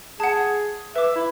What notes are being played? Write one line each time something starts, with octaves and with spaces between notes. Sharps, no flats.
G#4 F#5 A5
B4 E5 D6
E4